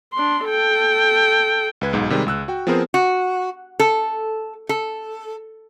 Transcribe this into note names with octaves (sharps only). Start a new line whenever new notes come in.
D4 C6
A4 G5
C#2 B4 G#6
B1 G#2
C3 D#3 G3 G#3
C#2 E6 F#6
F#4 G5
F3 B3 C4 G#4 A#4 C5
F#4
A4
A4